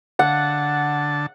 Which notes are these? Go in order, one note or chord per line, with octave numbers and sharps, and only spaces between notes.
D3 F#5 A5